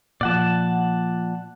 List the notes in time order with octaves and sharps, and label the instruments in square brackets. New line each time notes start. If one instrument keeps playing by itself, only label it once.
[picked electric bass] A#2 F3 [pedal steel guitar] D5 F#5 A5